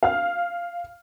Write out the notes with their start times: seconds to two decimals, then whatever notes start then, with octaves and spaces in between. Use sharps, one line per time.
0.03 F5 F6